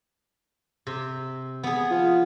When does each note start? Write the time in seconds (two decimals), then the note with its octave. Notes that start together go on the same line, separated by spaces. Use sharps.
0.87 C3
1.63 B3 G#4
1.91 F3